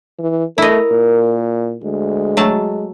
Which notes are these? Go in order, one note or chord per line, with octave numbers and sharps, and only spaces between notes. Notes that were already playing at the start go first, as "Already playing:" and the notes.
E3
A3 E4 A#4 D#5
A#2
D2 G#3
F#3 A3 A5